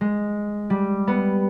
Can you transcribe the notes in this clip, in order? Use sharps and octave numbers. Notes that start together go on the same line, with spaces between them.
G#3
G3
B3